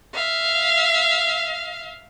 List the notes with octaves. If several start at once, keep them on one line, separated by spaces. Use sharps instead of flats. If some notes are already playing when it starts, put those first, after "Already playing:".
E5 F5